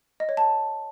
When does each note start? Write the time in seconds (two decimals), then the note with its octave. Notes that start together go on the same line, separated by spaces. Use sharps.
0.20 D#5
0.29 C#5
0.37 A5